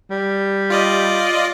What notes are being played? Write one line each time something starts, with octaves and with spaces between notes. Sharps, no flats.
G3
F4 D5 D#5